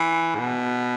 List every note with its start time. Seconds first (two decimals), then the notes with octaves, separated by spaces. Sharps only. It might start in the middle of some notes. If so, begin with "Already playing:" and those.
Already playing: E3
0.35 G#2
0.39 B2